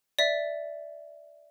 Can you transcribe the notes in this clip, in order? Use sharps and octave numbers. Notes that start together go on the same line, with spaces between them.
D5 E5